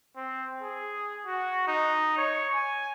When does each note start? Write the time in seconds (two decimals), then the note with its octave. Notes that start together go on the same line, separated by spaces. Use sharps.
0.17 C4
0.62 G#4
1.26 F#4
1.68 D#4
2.18 C#5
2.54 G#5